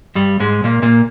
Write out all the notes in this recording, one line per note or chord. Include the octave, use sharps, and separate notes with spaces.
G2 G3
G#2 G#3
A#2 A#3
A#2 A#3